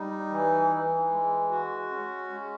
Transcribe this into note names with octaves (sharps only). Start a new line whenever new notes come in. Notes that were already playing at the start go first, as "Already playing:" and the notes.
Already playing: G3 D#4
E3
E3
G#3
F#4
C#4
G#3